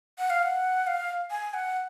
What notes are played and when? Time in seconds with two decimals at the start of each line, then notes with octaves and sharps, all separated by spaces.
0.19 F#5
0.30 F5
0.43 F#5
0.87 F5
1.31 G#5
1.54 F#5